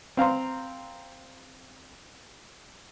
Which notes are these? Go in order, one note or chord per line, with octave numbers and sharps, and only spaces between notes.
C4 F5 A#5 C6